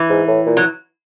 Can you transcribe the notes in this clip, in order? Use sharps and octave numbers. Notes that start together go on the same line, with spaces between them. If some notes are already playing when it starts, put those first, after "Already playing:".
Already playing: E3
G#2
A2
A#2
F#3